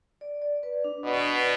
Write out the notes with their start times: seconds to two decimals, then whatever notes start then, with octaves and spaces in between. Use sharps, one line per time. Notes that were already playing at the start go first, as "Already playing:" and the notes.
0.21 D5
0.42 D5
0.63 B4
0.84 D4
1.04 B2 D4
1.26 B4